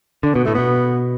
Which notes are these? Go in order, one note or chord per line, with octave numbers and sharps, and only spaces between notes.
D3 D4
B2 B3
A2 A3
B2 B3